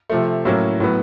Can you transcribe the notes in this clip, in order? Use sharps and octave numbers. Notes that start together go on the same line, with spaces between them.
C3 F3 A3
A2 F#3 A#3 C#4 E4
A2 F#3 B3